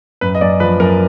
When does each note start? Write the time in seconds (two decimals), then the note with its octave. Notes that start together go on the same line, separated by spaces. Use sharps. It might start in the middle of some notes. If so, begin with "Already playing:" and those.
0.21 F#2 B4
0.35 D#5
0.41 F#2 D5
0.60 F3 B4
0.80 F#2 A#4